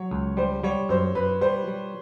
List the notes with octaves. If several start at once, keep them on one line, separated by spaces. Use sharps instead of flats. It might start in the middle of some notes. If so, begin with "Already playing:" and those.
Already playing: F#3 C#5
C#2
G3 C5
G3 C#5
F#2 C5
F#2 B4
G3 C5
G3